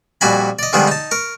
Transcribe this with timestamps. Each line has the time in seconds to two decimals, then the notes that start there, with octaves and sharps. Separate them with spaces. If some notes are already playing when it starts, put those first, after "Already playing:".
0.21 F2 A#2 G3 F#4 G#5 B5
0.59 D5 D#5
0.73 D3 D#3 F3 G3 G#3 B3
0.87 D#4 A5
1.11 A#4 C#6